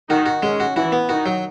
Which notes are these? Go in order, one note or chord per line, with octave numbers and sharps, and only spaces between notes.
D#3 D#4 F#4
F#4
G#3 C#4
F#4
E3 E4 F#4
B3
D#3 D#4 F#4
F#3